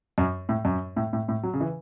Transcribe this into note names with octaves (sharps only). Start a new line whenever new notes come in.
F#2
A2
F#2
A2
A2
A2
F#3
C#3
E3